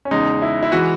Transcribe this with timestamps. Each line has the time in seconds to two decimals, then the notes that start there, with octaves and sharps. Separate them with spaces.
0.05 C#4
0.11 E2 C#3 G#3 D#4
0.42 E4
0.63 E4
0.72 E3 G#3 F#4